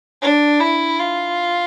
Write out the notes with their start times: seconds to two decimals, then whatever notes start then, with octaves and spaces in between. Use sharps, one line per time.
0.22 D4
0.60 E4
1.00 F4